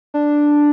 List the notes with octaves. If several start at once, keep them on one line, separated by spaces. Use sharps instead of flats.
D4